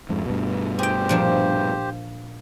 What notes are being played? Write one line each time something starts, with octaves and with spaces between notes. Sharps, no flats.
F2 G#2
G2 B2
G4 G#4 C5 G5
A#2 F3 D4